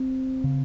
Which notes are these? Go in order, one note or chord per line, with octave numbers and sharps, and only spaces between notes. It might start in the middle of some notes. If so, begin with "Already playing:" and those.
Already playing: C4
C#3